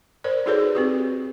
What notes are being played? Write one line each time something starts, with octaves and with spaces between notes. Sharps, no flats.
A#4 C5 D5
D#4 F#4 G#4 A4 B4 C#5
C4 F#4 G4